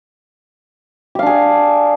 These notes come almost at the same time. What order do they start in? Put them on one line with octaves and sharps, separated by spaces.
G4 F5 D4 G#4